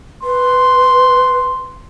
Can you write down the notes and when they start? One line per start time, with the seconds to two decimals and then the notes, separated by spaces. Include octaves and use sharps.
0.23 B4 C6